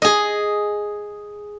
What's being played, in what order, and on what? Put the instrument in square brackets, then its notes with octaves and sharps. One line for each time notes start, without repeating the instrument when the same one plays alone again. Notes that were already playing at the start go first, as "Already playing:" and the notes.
[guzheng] G#4 D#5